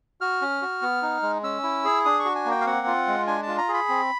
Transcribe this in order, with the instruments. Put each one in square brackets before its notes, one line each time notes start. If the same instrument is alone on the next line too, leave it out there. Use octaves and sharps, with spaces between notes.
[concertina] F#4 F6
C#4
F#4
B3
D#4
G#3
C#4 E6
E4
G#4
D4 D#6
C#6
F#4
G#5
A#3
G5
F5
C4 F#5
F4
G#3
D4 G#5
F4 A5
A#5
G#4
B5
C4